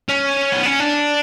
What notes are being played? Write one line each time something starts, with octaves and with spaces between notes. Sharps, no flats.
C#4
B3
C#4
D4